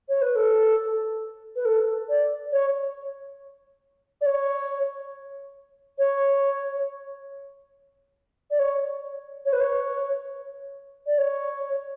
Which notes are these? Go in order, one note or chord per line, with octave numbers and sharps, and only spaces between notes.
C#5
B4
A4
B4
A4
D5
C#5
D5
C#5
C#5
D5
C#5
C#5
B4
C#5
D5
C#5